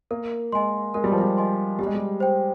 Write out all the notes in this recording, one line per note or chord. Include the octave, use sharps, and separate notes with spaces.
A#3 A#4
G#3 D#5 G#5 C6
G#3 A#4
G3
F3
G3
D#5 G#5 C6
G3 G4
G#3
G3
C5 G5